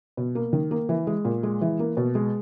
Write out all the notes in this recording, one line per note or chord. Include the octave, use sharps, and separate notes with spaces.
B2
A#3
D#3
A#3
E3
G#3
A#2
G#3
E3
A#3
B2
G#3